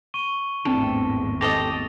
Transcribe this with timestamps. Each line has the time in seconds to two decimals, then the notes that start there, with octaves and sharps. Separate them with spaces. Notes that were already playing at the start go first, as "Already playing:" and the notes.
0.14 C#6 D#7 G7
0.65 G#1 E2 A2 C4 D4 E4 A4 D7
1.41 G4 A4 D#5 A#6 F7